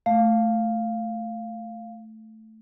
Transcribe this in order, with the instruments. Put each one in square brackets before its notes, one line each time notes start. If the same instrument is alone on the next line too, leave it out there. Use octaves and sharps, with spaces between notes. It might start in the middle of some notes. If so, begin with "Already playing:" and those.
[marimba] A3 [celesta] F5